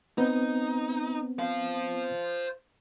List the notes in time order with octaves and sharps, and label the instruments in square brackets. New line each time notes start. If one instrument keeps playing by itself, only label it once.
[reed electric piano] B3 C4 [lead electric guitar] D#4
[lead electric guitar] C5 F5